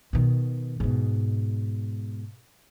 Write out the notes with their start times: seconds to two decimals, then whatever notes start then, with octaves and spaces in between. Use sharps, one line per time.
0.13 B2 D#3
0.80 G#2 B2